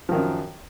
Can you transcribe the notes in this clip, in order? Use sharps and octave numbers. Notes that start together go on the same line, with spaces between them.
F#2 D#3 F3